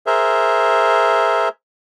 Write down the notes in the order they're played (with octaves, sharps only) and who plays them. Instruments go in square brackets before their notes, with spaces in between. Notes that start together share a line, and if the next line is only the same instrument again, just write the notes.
[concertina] G#4 A#4 C5 E5